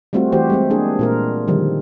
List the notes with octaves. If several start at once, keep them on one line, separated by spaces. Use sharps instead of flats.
G3 A3 C4 F4 F#4
E3 A3 F#4 G4 C5
G3 G#3 C4
A#3 D4 G#4
A#2 F4 A#4
D3 D#3 F3 G3